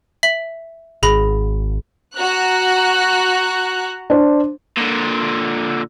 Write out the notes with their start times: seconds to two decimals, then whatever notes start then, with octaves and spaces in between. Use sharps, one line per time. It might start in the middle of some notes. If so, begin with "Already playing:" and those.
0.23 E5 B6 F#7
1.03 G#1 G#4 B5 A#6
2.16 F#4 A#5 F#6
4.10 D4 C5
4.77 A#2 D3